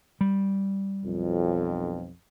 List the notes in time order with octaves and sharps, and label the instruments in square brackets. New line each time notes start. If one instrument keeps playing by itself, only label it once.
[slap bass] G3
[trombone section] B1 F2